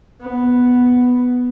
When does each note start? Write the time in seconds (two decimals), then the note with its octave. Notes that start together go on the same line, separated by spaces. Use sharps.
0.21 B3